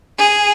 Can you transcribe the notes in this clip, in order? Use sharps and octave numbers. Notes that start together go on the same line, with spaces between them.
G#4